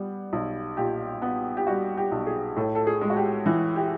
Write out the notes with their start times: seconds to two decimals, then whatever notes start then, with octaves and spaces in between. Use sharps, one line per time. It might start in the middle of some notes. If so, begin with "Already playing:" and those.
Already playing: G3 B3
0.33 B1
0.77 A#2 G4
1.22 B3
1.57 G4
1.67 G3 F#4
1.97 G4
2.12 B1
2.27 G#4
2.56 A2 A4
2.75 A4
2.87 G#4
3.02 G#3
3.10 F#4
3.17 G4
3.46 E3
3.76 G4